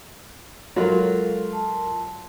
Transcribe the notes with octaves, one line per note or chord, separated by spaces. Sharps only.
F#3 G#3 F4 A4 A#4 F5 C6
A5